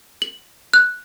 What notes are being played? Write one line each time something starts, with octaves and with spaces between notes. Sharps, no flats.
F#7
F#6